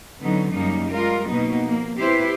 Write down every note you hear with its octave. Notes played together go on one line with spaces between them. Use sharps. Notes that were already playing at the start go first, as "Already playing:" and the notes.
D3 F#3 B3 C#4 D#4
F#2 C#3 G3 A#3 D#4
G3 G#3 F4 A#4
B2 F#3 A#3 B3 D#4
F3 A#3
C4 E4 G4 B4 C5